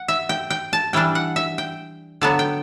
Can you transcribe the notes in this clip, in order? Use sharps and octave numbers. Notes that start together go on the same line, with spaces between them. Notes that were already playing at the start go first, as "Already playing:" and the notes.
Already playing: F#5
E5
G5
G5
A5
E3 G3 D4 G5
F#5
E5
G5
D3 F#3 B3 A5
G5